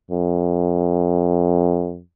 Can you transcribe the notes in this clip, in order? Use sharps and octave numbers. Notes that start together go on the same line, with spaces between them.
F2